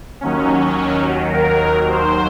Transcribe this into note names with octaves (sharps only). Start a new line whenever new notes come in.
D#2 D#3 F#3 C#4
A#4
C5